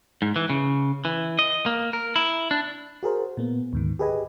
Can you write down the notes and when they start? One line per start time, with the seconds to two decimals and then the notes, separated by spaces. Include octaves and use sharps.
0.22 G#2
0.36 E3
0.50 C#3
1.05 E3
1.39 D#5
1.66 A#3
1.93 A#4
2.16 E4
2.51 D4
3.03 F#4 G#4 A#4 C5
3.37 A#2 A#3 B3
3.73 D2 G#2 D#3
3.99 G4 G#4 B4 D#5 G#5